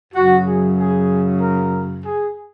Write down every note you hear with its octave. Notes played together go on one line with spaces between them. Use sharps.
F#2 C#3 F#3 F#4
G#4
G#4
A#4
G#4